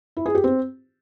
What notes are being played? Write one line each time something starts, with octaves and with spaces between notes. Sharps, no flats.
E4
G#4
G4
C4